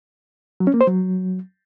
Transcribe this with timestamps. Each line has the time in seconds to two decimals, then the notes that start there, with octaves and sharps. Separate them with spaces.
0.60 F#3
0.67 C#4
0.74 A#3
0.81 C5
0.87 F#3